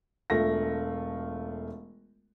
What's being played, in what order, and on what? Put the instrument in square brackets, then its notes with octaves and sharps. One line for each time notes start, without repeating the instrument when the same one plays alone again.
[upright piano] E1 A3 F4 A#6